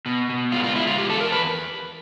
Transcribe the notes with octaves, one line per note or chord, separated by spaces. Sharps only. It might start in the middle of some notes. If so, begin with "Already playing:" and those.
B2
B2
G#3 F4
F4
G#3 E4
F4
E2 G4
A4
E2 A#4
B4